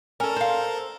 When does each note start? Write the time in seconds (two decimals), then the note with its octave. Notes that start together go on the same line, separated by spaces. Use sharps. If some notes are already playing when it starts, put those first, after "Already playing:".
0.20 C#4 A4 A#4
0.36 C5 F5